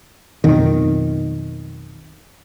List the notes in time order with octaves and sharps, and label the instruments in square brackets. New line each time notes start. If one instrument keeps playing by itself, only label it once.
[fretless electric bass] B1 F2 D#3